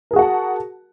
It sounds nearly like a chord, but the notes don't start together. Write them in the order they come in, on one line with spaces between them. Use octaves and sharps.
A#4 G#4 F#4 F#5 A5